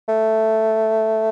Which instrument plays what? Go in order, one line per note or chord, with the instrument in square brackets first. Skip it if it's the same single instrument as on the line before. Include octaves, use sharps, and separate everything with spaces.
[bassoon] A3